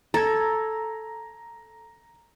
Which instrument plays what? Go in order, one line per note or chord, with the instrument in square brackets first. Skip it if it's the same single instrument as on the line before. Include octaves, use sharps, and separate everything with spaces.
[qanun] A4 [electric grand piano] A#5 G#6